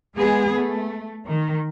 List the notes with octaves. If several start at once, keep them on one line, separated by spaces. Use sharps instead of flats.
G#3 B3 G#4
A3
D#3